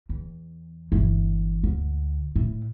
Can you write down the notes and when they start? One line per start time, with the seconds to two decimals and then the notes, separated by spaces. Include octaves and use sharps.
0.09 E2
0.92 G1 E3
1.64 D2
2.35 A2